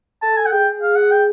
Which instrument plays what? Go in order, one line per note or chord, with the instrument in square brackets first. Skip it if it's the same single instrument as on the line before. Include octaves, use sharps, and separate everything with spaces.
[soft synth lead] A4 [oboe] A5
[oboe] G#5
F#5
[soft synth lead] G#4 [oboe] G5
[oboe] F5
F#5
G5